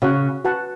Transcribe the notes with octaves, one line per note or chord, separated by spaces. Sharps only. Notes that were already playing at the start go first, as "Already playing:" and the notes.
C#3 F#4 C#5 F#5
F#4 B4 F#5 A5